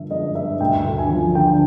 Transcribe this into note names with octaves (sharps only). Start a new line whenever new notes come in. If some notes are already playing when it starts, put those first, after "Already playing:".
Already playing: G2 D3 F3 E5
G#3 D#5
G2 E5
D2 G5
D2
G#5
F3
D3 G5